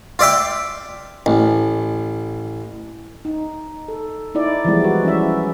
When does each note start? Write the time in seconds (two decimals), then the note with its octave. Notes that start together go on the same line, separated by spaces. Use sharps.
0.19 F4 D5 E5 G5
1.26 A1
3.25 D#4
3.88 A4
4.35 D#4 E4 D5
4.65 E3 F3 G3 G#3 B3 E4
4.84 F#4
5.04 C#4 E5